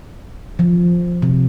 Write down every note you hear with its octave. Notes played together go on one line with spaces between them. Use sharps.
F3
C3